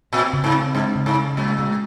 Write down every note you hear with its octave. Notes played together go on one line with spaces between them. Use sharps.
A#2 C4
C#3
G#2
C4
G2 G#3
C#3
G#2
C#3
A#2 G#3
G#3